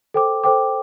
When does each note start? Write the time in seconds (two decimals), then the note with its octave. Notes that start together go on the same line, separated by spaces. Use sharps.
0.14 A4 C5 G5 D6
0.44 A4 C5 G5 D6